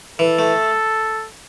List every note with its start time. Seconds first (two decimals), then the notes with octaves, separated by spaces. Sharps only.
0.19 E3 A4
0.39 A3